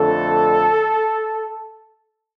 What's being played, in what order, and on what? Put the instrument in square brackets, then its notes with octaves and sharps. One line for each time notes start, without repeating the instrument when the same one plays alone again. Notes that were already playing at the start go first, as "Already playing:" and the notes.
Already playing: [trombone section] F2 D3 A3 A4